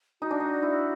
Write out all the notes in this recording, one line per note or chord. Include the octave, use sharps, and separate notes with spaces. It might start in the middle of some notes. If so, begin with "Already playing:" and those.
D#4 F#4
D4
D#4
E4